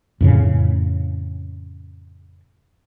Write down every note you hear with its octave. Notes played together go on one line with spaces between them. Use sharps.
F2 A2 C#3